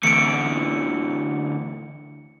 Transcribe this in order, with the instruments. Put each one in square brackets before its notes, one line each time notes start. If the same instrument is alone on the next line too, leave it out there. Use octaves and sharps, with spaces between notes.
[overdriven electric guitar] D2 E3 [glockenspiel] C#7 D7